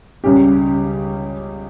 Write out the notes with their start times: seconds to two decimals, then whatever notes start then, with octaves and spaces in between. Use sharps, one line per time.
0.24 C#2 C#3 G3 C#4 G4